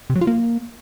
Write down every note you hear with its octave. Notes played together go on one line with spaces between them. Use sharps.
C3
F#3
F4
A#3